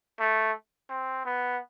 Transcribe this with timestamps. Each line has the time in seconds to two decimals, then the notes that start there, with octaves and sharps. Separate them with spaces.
0.20 A3
0.90 C4
1.26 B3